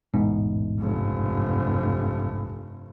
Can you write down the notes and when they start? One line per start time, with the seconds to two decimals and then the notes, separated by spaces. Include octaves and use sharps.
0.14 A1 E2 G#2 B2
0.79 F1 G2